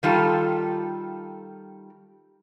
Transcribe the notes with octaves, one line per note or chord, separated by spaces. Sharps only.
D#3 G3 F4 A4